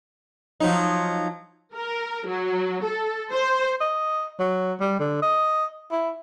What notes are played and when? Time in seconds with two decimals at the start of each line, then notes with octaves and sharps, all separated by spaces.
0.60 F3 F#3 D#4
1.74 A#4
2.26 F#3
2.84 A4
3.32 C5
3.81 D#5
4.40 F#3
4.80 G3
5.00 D3
5.22 D#5
5.92 E4